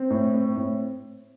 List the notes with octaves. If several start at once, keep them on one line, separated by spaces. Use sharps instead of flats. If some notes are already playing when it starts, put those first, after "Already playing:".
Already playing: C4
A2
C4
A2